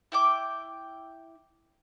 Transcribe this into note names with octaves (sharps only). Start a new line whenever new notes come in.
E4 G5 D6